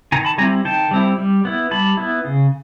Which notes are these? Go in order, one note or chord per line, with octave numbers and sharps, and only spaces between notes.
D#3 G#5 A#5
A5 B5
G3 C4 E4 G#5 A#5
D#3 G5 A5
G3 C4 E4
G3
B3 E4
G3 A5 B5
B3 E4
C#3